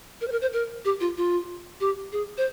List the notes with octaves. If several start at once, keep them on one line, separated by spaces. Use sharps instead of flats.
A#4
C5
A#4
C5
A#4
G4
F4
F4
G4
G#4
C5